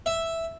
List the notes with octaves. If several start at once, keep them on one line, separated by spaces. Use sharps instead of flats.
E5